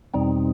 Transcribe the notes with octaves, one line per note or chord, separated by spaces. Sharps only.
E2 B2 G3 C4 D#4